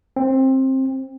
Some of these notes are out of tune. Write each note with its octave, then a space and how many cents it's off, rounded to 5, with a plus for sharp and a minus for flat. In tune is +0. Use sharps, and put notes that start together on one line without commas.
C4 +20